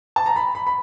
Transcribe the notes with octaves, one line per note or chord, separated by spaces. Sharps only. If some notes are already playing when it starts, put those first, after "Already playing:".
A5
A#5
B5
B5
B5